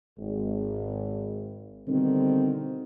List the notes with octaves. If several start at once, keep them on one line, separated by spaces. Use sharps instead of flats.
G#1
B2 D3 D#3 G3 C4